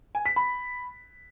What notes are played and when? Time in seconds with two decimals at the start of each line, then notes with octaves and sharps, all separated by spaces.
0.15 G#5
0.26 B6
0.36 B5